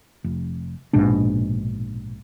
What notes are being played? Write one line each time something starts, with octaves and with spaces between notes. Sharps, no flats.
F1
A#1 G#2 B2 D4